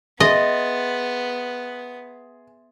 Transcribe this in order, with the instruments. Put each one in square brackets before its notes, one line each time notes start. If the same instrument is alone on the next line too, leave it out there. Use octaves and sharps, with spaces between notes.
[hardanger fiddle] B3 [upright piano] G#4 [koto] D#5 [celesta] E5 C6 A6